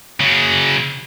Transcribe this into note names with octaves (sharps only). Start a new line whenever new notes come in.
C#3 F#3